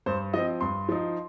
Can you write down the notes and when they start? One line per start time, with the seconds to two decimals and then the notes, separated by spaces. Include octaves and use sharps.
0.06 G2 C5
0.34 F3 C4 D#5
0.61 G2 C6
0.89 F3 D#4